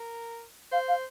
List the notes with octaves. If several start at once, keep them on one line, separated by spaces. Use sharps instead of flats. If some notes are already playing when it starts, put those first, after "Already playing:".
Already playing: A#4
C5 F5
F5